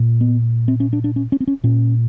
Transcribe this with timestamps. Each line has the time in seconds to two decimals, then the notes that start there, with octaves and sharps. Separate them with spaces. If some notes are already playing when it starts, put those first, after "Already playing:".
Already playing: A#2
0.21 B3
0.68 C4
0.80 C#4
0.93 D4
1.04 D4
1.16 C#4
1.32 C#4
1.40 C4
1.48 C#4
1.64 A#2 C#4